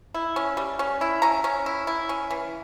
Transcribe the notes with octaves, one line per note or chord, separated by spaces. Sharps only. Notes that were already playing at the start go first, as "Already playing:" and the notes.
E4
C#4
G3
C#4
E4
C#4 A#5
C#4
E4
E4
C#4
E3